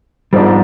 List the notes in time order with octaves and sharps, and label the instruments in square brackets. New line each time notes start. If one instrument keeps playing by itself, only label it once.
[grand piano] G#2 F3 G#3 B3 D4 [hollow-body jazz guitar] G3